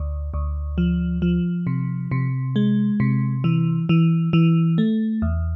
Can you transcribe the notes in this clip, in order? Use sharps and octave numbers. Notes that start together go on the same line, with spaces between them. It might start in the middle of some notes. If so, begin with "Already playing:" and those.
Already playing: D2
D2
F3
F3
C3
C3
G#3
C3
E3
E3
E3
A3
E2